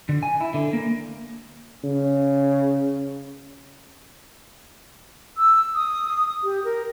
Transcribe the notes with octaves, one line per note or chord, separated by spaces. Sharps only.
D3
G#5
E4
D3
A#3
C#3
E6
D#6
G4
A#4